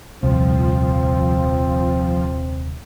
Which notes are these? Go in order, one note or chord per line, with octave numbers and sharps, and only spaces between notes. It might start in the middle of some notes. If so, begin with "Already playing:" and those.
D#1 C2 F3 C4